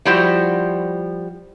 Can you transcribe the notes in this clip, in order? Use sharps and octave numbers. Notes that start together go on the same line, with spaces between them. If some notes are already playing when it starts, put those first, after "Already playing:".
F3 G3 E4 F#4 C5 F#5